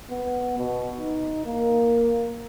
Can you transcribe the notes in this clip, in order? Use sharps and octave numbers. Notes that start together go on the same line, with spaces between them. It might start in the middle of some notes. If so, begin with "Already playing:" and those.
B3
B2
D#4
A#3